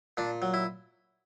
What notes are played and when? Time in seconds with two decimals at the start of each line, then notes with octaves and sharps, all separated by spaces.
0.17 A#2 D4
0.42 F#3
0.54 E4